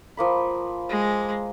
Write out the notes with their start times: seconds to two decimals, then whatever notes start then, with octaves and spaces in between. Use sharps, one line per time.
0.17 F3 A#3 B5
0.89 G#3